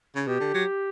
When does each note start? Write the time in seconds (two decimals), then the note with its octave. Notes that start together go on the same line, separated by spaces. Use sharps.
0.16 C#3
0.27 B2 G4
0.40 D3
0.54 F#3